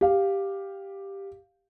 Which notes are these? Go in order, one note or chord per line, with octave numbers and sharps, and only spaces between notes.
G4 F5